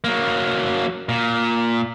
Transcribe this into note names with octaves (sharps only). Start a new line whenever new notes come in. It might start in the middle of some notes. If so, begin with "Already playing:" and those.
F#3 A#3
A#2